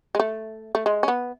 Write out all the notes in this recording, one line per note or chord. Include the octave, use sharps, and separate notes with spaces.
G#3
A3
A3
G#3
C#4
B3